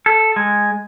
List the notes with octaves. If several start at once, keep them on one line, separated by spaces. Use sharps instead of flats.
A4
G#3